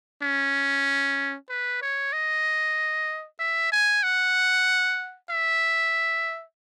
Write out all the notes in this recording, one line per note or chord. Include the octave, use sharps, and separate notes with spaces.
C#4
B4
C#5
D#5
E5
G#5
F#5
E5